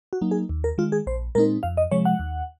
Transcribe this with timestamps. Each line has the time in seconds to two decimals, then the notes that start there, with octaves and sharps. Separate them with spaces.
0.13 F#4
0.21 F#3 A#3 D#4
0.31 G#4
0.49 D#2
0.64 A#4
0.78 D#3 G#3 F4
0.92 G#4
1.07 A#1 C5
1.35 A#2 G#3 C4 D#4 A#4
1.63 F2 F5
1.77 D#5
1.91 C3 F3 G#3 C#5
2.05 F#5
2.19 D#2